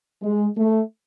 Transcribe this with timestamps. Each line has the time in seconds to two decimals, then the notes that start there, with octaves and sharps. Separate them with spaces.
0.22 G#3
0.57 A3